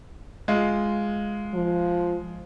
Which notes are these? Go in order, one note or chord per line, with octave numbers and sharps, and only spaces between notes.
G#3 F4
F3